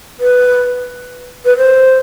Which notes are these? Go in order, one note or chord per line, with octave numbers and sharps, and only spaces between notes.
B4
B4
C5